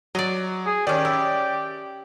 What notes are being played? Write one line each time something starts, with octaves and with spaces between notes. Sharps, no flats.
F#3 D5 D#5
G#4
D#3 C#4 G4 D5
E4